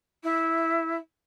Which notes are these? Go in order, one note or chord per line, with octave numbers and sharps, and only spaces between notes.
E4